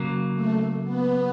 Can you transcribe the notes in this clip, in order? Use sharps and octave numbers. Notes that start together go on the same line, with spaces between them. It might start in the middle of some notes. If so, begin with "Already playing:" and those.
Already playing: C#3 F#3 A#3
A3
B3